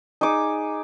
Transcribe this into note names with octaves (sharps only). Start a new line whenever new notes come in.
D#4 G#4 D6